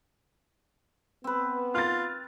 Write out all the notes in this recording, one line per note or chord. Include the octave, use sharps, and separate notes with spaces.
B3 C4 B4
F4 F6 A6